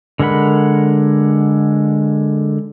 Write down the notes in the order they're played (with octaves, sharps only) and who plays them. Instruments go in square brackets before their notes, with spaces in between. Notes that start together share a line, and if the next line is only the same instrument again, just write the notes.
[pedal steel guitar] D3 G#3 A#4 F#5 B5